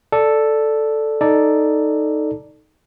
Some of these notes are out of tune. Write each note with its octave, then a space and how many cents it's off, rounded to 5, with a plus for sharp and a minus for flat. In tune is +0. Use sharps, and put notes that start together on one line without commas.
A4 +0 D5 +0
D#4 +0 A4 +0 D5 +0